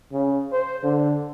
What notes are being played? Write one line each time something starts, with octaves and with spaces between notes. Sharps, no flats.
C#3
C5
D3